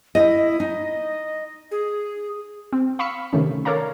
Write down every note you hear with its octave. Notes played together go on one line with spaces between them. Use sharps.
E4 D#5
D#4 D#5
G#4
C4
F5 B5 C#6 E6 B6 C#7
C3 D#3 A3 C#4
A4 A#4 C#5 D5 F5 A#5